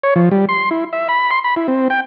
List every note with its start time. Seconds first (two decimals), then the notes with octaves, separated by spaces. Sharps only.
0.03 C#5
0.16 F3
0.31 G3
0.49 C6
0.71 E4
0.93 E5
1.08 B5
1.31 C6
1.44 B5
1.56 E4
1.68 C4
1.90 G5